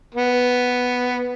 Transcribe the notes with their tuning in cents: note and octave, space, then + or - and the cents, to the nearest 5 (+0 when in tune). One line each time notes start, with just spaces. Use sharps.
B3 +0